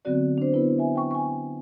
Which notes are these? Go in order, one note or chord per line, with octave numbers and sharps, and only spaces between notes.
D3 F#3 B3 C4 F#4 D5
D4 C5
B3 E4 B4
E5 G#5
G5 C#6
G#5 C#6